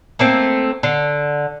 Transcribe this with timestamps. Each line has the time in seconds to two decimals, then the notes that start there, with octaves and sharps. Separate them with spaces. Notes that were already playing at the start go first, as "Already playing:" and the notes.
0.19 A3 A#3 C4
0.83 D3